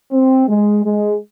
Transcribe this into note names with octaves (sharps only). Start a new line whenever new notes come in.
C4
G#3
G#3